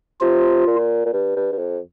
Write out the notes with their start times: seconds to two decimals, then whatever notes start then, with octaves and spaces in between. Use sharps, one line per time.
0.21 C3 F4
0.67 A#2
1.05 A#2
1.13 G2
1.36 G2
1.52 G2
1.58 F2